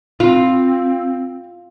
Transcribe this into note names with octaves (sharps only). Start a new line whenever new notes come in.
C4 F4